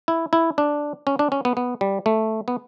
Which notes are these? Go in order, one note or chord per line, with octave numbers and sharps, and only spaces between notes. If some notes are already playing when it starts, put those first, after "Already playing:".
E4
E4
D4
C#4
D4
C#4
B3
B3
G3
A3
B3